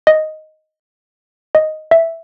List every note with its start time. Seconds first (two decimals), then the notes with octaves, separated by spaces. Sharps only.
0.07 D#5
1.55 D#5
1.91 E5